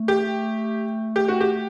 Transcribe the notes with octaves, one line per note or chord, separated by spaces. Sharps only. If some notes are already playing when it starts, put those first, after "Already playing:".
Already playing: A3
G4
G4
F#4
G4